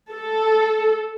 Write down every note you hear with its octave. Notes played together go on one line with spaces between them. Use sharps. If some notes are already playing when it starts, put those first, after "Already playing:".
A4